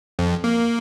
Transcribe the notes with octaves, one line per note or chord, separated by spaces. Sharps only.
F2
A#3